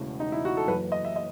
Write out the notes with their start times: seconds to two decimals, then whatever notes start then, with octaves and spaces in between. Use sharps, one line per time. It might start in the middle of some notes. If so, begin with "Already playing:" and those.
Already playing: E1 E2 C#3 E3 A3
0.20 D#4
0.32 E4
0.45 F#4
0.57 A4
0.68 F#1 F#2 E3 B4
0.92 D#5
1.05 E5
1.16 D#5